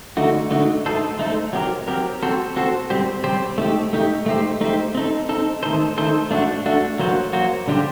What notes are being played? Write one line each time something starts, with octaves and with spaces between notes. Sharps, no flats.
D3 A3 D#4 F#4
D3 A3 D#4 F#4
A3 D#4 A4 C5
A3 D#4 A4 C5
F#3 C4 G4 A#4
F#3 C4 G4 A#4
C4 F#4 A4 C5
C4 F#4 A4 C5
G3 C4 G4 C5
G3 C4 G4 C5
A3 D#4 G4
A3 D#4 G4
A3 D#4 G4 C5
A3 D#4 G4 C5
C4 D#4 A4
C4 D#4 A4
D#3 A3 D#4 A4 C5
D#3 A3 D#4 A4 C5
A3 D4 F#4
A3 D4 F#4
F#3 A#3 F#4 C5
F#3 A#3 F#4 C5
D3 G3 D4 G4 C5